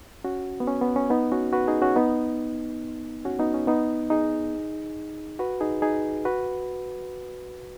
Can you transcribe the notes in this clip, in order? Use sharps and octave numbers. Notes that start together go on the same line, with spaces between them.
C#4 F#4
B3
C#4
B3
C#4
B3 D#4
C#4 F#4
F#4 B4
D#4 G#4
C#4 F#4
B3 D#4
C#4 F#4
B3 D#4
C#4
B3 D#4
D#4 G#4
F#4 B4
D#4 G#4
D#4 G#4
F#4 B4